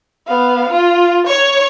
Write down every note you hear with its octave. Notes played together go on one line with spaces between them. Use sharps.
B3 F5
F4
C#5 C#6